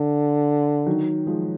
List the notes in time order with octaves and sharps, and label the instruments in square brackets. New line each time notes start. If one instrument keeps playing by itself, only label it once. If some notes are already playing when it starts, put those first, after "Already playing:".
Already playing: [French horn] D3
[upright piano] D#3 F#3
F3 G#3